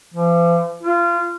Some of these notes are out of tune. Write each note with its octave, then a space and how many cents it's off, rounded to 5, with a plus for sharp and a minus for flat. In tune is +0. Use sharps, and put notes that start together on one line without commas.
F3 -40
F4 -25